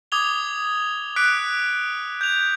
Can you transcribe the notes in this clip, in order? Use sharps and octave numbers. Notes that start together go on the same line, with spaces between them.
D6 D#6 G#6 F7 G7
D6 F#6 B6 C#7 D7
G6 F7